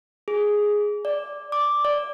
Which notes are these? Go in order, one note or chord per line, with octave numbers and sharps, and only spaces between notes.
G#4
D5
D6
D5